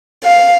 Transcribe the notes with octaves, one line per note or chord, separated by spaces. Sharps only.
F5